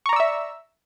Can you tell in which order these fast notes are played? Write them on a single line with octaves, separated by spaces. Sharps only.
C#6 A#5 D5 E6 E5